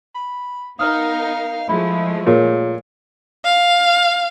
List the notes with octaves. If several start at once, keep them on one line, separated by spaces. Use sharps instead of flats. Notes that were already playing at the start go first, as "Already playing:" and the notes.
B5
B3 D#4 A#4 F5 D#6 F6
F3 G#3 A3 E4 B5
A#2 G#4 A#4 C#5
F5